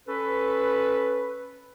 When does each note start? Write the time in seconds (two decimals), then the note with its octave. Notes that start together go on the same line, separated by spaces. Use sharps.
0.07 C#4 A4 B4